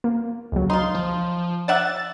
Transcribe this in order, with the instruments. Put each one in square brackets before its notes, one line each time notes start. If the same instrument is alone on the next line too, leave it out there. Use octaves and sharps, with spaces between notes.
[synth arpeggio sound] A#3
C#2 F#3
[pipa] D#4 F4 [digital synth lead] C6
[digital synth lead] F3
[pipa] D5 E5 F#5 [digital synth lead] A6